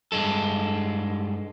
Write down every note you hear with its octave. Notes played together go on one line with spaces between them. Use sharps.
G2 G#3 A4